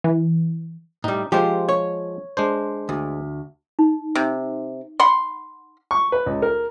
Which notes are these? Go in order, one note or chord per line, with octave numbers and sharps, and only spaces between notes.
E3
A2 G3 D#4
F3 G#3 F4 G4 C5
C#5
G#3 D4 C5
D2
D#4
C3
F#5 B5 C6
C#6
B4
C#2
A#4